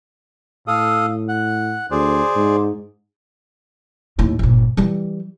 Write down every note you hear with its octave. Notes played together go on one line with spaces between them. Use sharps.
A2 A4 F5 D#6
F#5
D2 G#4 C5 D5
G#2
D#2 A2
G1 A#2
E3 G3